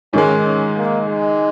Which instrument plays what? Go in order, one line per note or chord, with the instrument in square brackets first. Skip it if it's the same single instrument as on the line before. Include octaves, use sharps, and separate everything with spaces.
[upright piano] G#2 D#3 G#3 [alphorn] C#4
[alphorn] C#4
A#3
G#3